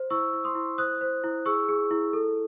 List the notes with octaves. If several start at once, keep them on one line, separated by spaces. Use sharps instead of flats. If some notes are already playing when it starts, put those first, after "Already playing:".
Already playing: C5
E4 C#6 E6
E4
C6 D#6
E4
C5 D#6 F#6
C5
E4
G#4 C#6 E6
G#4
E4
A4